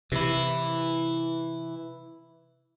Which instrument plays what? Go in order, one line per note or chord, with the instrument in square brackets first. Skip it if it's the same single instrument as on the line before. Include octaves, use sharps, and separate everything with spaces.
[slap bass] C3 [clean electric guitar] E3 E4